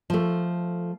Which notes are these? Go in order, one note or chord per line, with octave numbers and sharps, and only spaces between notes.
F3 A3